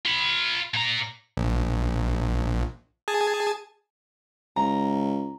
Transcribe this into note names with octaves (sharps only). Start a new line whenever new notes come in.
F4 B5
A#2 A#5
A#1
G#4 G#5 A5
C#2 A#5